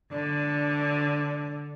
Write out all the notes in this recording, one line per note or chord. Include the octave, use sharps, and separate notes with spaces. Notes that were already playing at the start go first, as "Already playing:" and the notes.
D3 D4